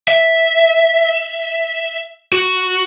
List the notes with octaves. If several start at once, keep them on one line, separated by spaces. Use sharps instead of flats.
E5
F#4